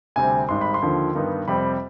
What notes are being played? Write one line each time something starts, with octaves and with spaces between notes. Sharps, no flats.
D2 C3 G3 C4 G#5
G#1 G#2 G3 C6
B5
C6
D#2 D3 F3
G2 D#3 B3 D#4
F2 C3 G3 C4 B5